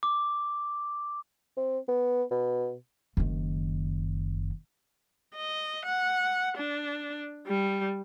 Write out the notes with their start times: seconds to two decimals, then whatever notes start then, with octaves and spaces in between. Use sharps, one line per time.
0.03 D6
1.57 C4
1.89 B3
2.31 B2
3.17 F#1 D#3
5.36 D#5
5.85 F#5
6.57 D4
7.47 G3